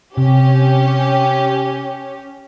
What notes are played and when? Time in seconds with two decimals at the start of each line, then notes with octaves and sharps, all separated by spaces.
0.17 C3 C#4 G4